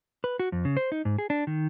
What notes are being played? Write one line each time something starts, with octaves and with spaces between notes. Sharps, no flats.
B4
F#4
F2
C#3
C5
D#4
G#2
G#4
D4
D#3